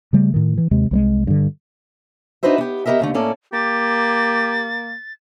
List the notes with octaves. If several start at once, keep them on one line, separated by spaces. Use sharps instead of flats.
C#3 G3 A3
A2 D#3
E3
D#2 C3 G#3
C2 F#3 G#3
G2 D3
D4 D#4 F#4 B4 C5 E5
B3 G4
B3 G4 A#4 D#5 E5
D#2 D3 A3
A2 A#3 C#4 A4 D5
A#3 G4 A6